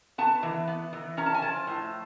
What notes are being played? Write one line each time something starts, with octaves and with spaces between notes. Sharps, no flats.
B3 A5
E3
B3
E3
C#4 A#5
A5
G#5
F3 A5
A2